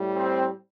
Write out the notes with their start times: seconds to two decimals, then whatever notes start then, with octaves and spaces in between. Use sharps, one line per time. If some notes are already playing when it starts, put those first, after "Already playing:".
Already playing: A2 G3
0.15 C4